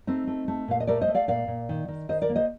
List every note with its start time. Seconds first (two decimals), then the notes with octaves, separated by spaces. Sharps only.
0.07 A3 C4 D#4
0.27 A3
0.48 A3
0.68 A#2 F5
0.80 D#5
0.87 A3 A#4 D5
1.01 C5 D#5
1.08 A3
1.14 D5 F5
1.28 A#2 D5 F5
1.48 A#2
1.69 D#3
1.88 D#3
2.09 D#3 C5 D#5
2.22 A#4 D5
2.29 A#3
2.36 C5 D#5